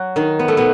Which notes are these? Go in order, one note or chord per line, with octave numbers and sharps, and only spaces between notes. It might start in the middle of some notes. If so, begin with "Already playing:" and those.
Already playing: F#3 F#4
D#3 D#4
B3
A3
B2 B3